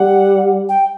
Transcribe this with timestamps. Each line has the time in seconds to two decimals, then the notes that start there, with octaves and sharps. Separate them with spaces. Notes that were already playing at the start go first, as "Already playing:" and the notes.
Already playing: G3 F#5
0.69 G5